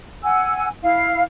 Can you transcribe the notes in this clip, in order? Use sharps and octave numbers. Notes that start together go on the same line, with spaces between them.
F#5 G#5 E6
E4 F5